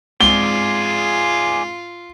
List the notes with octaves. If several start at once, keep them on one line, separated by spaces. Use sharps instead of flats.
G#2 G#3 C4 F4 G#4 D5 G7